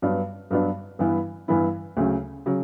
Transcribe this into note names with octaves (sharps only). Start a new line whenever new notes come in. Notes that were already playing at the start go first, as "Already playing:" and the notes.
G2 F#3 B3 D4
G2 F#3 B3 D4
G2 E3 B3 E4
G2 E3 B3 E4
D2 C#3 F#3
C#3 F#3